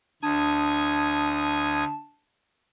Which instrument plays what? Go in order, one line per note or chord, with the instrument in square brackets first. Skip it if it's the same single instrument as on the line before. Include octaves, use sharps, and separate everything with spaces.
[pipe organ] D2 D#6 G#6 [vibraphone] D4 [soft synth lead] A5